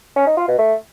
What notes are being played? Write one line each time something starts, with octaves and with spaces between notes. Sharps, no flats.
C#4
D#4
F4
B2
A3